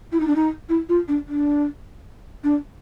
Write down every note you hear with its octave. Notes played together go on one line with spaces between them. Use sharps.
E4
D#4
D4
D#4
E4
F4
D4
D4
D4